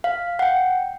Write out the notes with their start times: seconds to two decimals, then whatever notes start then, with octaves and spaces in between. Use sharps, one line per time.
0.04 F5
0.39 F#5 G5